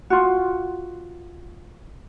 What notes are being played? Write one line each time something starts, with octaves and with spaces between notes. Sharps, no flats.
F4 F#4